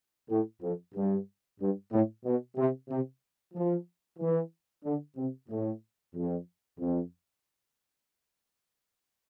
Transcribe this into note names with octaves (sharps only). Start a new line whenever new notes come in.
A2
F2
G2
G2
A2
B2
C3
C3
F3
E3
D3
C3
A2
F2
F2